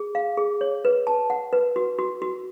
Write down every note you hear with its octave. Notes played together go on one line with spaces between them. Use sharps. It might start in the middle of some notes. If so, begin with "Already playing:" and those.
Already playing: G#4
F5
G#4
C#5
B4
A5
F#5
B4
F#4
F#4
F#4